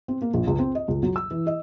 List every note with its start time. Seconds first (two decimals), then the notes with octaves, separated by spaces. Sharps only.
0.08 C4
0.22 A#3
0.34 A#1
0.47 C#2
0.59 C4
0.75 D#5
0.88 C#2
1.03 F#3
1.16 E6
1.31 E3
1.47 D#5